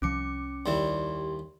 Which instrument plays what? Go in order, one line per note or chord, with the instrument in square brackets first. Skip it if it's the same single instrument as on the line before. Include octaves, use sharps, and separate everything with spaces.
[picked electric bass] C2 F3 [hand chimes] C#4 D6 C#7
[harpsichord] D#2 G3 E4 [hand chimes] G4 D5 C6